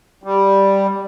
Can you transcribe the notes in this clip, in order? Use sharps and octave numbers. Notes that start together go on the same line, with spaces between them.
G3